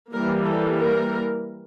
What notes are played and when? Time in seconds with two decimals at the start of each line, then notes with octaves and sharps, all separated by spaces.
0.13 E3 G3 A#3 A#4
0.45 A4
0.78 A#4